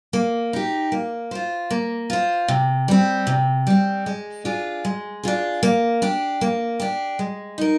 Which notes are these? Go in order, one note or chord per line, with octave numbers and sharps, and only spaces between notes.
A#3
D#4 G4
A#3
F4 C5
A#3
F4 C5
C3
G3 C4
C3
G3 C4
G#3
D4 F4 G#4
G#3
D4 F4 G#4
A#3
D4 G4
A#3
D4 G4
G#3
D#4 A#4